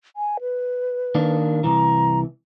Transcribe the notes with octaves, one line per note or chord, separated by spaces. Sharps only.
G#5
B4
D#3 A#3 D4
C2 E3 A#5